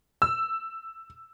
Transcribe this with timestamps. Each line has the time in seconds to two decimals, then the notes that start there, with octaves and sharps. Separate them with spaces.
0.22 E6